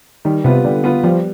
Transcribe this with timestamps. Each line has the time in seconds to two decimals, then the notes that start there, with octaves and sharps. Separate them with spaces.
0.25 D#3 G3
0.44 C3 B3 F4 B4
0.64 D3 G3
0.84 B3 F4 B4
1.03 F3 G3